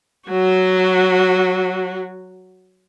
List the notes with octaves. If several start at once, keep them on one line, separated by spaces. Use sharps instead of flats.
F#3 F#4